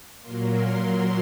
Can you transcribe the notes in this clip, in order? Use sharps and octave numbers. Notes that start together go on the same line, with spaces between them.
A#2 F#3 A#3 C6
C6
C6